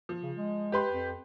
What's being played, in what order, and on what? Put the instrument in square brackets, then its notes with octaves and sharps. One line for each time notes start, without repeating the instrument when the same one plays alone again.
[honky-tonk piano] F3
[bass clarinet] C#3
G#3
[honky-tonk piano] G4 B4 C6
[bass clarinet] F2